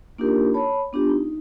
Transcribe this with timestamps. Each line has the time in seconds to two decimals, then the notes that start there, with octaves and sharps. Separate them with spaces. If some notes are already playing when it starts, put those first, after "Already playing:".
0.18 A#3 D4 D#4 F4 G4 A#4
0.54 C#5 A5 B5
0.93 B3 D4 F4 G4
1.10 D#4